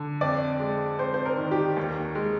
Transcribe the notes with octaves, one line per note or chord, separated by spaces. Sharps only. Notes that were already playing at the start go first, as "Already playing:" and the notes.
Already playing: D3
F2 D5
G#3
F2 C5
C5
A#4
D#3
G4
D#2
G#3